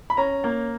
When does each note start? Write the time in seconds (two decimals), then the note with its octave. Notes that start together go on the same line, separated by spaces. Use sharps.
0.10 B5
0.17 C#4 A#5
0.44 A#3